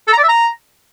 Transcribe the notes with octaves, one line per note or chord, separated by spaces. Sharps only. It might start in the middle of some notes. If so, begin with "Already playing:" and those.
A4
A#5
D5
E5
A#5